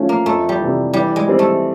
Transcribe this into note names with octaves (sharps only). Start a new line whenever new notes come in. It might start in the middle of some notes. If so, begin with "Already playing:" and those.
Already playing: A2 F3 A3 C#4
A#3
F2 A3
G3
C3 E3
E3 G3
G#3
G3 C4
A3